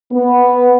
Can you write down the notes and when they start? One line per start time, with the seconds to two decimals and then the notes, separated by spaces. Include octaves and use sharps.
0.12 B3